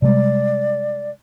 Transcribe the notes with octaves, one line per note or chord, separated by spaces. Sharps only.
C3 G3 G#3 D5